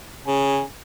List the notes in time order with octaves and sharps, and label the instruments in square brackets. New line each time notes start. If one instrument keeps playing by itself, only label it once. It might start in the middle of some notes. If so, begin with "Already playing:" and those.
[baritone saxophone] C#3 [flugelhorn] G#5